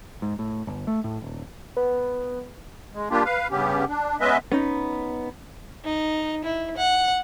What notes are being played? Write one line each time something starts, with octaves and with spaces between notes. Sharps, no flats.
G#2
A2
G1
A3
A2
D#1
B3
G#3
G3 A#3 D4 F4 G4
B4 F5
G2 C#3 B3 C#4 G4
D4
G#3 B3 C#4 B4 D#5 E5
B3 C#4 D#4
D#4
E4
F#5